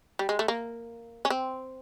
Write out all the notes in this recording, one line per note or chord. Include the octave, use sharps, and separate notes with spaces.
G3
G#3
A3
A#3
C#4
C4